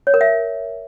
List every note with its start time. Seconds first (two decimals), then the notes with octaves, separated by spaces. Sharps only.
0.07 C#5
0.14 A#4
0.21 E5